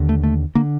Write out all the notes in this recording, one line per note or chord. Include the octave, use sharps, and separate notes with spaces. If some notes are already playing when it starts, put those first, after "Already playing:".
Already playing: D#2 D3
A3
A3
D3 A#3